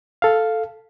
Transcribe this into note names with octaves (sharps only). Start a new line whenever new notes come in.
A4 F5